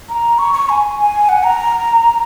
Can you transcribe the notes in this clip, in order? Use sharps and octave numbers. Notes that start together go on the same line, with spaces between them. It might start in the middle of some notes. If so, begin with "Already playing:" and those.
A#5
C#6
C#6
G#5
G#5
F#5
A#5